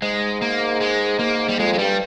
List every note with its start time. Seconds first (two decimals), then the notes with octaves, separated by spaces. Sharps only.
0.02 G#2 G#3
0.42 A#3
0.81 G#3
1.19 A#3
1.48 G3
1.59 F2 G#3
1.73 G#3
1.79 G2 G3